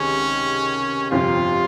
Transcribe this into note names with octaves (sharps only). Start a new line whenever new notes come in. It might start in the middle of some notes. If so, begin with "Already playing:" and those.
Already playing: C#2 C3 D#3 C#4
G1 F2 C3 F3 C4 F4